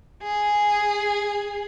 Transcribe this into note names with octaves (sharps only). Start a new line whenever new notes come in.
G#4